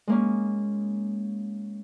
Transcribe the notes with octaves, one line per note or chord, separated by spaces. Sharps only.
G#3 A#3 C#4